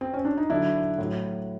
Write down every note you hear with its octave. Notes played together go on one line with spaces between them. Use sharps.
C4
C#4
D4
D#4
D3 F#3 D4 E4
A2 F#3